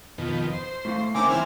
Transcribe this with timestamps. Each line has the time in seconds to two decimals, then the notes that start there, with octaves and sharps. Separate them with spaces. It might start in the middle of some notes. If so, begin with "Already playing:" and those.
0.18 F2 B2 D#3
0.53 C5
0.85 A2 A3 F5
1.15 C#3 A#3 C4 D#4 E5 G#5 D6
1.29 E3 G#3 C4 E4 F6